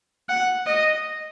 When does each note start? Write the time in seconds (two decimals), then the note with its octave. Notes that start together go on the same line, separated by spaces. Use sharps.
0.29 F#5
0.66 D#5